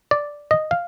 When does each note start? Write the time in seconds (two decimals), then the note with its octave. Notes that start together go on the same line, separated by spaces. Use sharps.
0.11 D5
0.51 D#5
0.71 F5